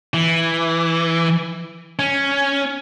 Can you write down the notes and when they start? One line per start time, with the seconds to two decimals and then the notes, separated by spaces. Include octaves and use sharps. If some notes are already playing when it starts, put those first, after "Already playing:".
0.14 E3
1.99 C#4